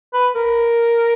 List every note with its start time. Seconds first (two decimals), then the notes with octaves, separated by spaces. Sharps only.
0.14 B4
0.35 A#4